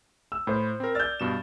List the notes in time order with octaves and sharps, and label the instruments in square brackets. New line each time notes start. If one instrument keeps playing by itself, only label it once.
[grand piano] E6
[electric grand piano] A2 [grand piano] C5 B5
[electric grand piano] C4 A#4
[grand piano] D5 G6 [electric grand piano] E6 F6 A6
[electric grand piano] G2 B2 E7